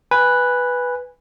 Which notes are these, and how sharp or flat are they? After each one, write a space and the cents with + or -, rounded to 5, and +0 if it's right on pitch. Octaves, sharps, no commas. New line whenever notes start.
B4 +0 G#5 -15